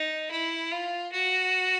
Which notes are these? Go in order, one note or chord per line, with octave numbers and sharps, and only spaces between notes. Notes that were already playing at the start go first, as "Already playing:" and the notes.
Already playing: D#4
E4
F4
F#4